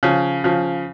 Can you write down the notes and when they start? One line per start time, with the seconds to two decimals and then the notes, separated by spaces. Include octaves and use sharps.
0.03 C#3 F3
0.44 C#3 F3